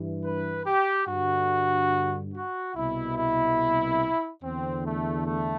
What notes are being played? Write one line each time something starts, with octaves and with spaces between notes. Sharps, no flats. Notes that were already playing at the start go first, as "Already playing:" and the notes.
Already playing: G2 E3
B4
G4
G2 D3 F#4
F#4
C2 B2 E4
E4
E2 D3 C4
A3
A3